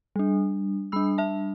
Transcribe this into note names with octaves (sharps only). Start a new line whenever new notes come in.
G3 D4
G3 D4 B5 E6
E5 A5